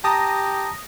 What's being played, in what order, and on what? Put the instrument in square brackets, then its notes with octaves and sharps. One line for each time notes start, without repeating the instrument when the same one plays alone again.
[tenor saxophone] G4 [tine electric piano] A5 A#5 [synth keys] D#6 A#6